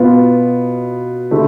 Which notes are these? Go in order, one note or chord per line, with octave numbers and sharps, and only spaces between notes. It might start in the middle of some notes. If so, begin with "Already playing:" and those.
Already playing: B2 B3 F4
D3 A3 E4 G4